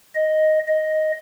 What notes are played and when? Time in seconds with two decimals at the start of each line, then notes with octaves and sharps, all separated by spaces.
0.15 D#5
0.68 D#5